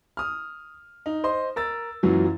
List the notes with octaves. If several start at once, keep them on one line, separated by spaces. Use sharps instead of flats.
D#6 F6
D#4
C5 D#5 C6
A#4 E6 A6
F#2 A#2 E3 F#3